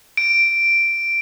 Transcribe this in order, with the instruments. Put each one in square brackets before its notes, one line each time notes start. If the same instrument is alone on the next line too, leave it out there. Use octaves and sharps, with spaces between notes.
[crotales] D7